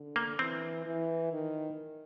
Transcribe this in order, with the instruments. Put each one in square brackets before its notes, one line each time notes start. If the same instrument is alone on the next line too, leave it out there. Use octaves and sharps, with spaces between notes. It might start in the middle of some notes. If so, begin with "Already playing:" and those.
Already playing: [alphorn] D3
[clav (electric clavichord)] A#3
[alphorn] E3 [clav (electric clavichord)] C4
[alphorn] E3
D#3